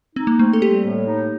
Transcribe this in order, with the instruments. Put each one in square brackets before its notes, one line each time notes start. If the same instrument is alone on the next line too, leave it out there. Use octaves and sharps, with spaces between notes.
[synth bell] C4 [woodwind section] D#4
[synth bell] A#3
[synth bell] A3 [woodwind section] C4
[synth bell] A4
[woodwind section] G3 [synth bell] G4
[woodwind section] A2
D#4